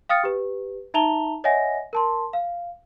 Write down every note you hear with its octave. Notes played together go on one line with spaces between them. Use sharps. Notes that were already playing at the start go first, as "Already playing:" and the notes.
F5 G5 D#6 F6 A6 C#7
G4 B4
D#4 E5 A5 A#5 F7 G7
C#5 D#5 E5 F#5 G#5 A#6
A#4 A5 C6
F5